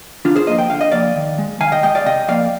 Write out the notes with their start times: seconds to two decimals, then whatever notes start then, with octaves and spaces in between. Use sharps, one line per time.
0.25 D3 D4 F4
0.36 G#4 C5
0.47 F3 A#3 C5 D#5
0.58 G5
0.70 D3 F5
0.81 D#5
0.92 F3 A#3 D5 F5
1.16 D#3
1.38 G#3
1.60 D#3 F5 G#5
1.72 D#5 G5
1.83 G#3 D#5 G5
1.95 D5 F5
2.06 C3 D#5 G5
2.28 F3 A#3 D5 F5